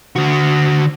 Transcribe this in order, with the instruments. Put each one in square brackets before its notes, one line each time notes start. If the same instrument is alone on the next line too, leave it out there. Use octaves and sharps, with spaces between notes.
[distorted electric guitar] D3 F#4